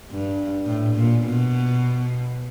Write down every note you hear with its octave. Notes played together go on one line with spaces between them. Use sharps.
G2
A2
A#2
B2